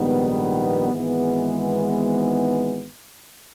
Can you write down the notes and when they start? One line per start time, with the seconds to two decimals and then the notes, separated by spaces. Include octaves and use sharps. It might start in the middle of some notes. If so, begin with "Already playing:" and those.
Already playing: A#1 G#2 D#3 G3 B3
0.92 G#1 G#2 E3 G#3 B3